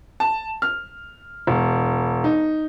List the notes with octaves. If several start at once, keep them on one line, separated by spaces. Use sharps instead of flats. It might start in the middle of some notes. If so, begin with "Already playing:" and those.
A5
F6
E1
D#4